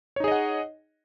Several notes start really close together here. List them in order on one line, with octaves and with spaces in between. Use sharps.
C#5 D#4 G#4 D#5 F#5